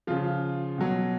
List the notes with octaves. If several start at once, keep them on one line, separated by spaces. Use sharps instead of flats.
C#3 F3 F4
B2 F#3